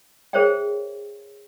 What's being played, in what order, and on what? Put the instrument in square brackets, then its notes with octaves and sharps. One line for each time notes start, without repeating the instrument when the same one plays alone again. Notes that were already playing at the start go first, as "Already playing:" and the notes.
[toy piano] G#4 A#4 C5 C#5 E5 G5